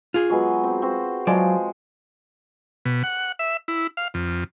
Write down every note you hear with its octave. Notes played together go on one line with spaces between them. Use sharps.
F4 G#4
F#3 G#3 B3
C4 C5
C4 F#4 C5
F3 F#3 G#3 C5 D5
B2
F#5
E5
E4
F5
F2